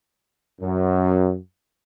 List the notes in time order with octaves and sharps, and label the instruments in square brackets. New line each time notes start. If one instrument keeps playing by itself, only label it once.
[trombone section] F#2